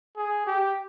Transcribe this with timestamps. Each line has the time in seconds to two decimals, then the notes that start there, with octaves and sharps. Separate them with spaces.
0.17 G#4
0.47 G4